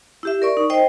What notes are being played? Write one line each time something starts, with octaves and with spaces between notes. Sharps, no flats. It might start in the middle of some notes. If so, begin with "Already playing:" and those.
E4 G4 E5
A#4 D5 C#6
D#4
C5 D#5 G5